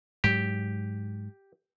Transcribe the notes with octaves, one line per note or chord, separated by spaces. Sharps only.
G#2 F#3 G4